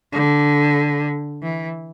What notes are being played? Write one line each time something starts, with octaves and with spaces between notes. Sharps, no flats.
D3
E3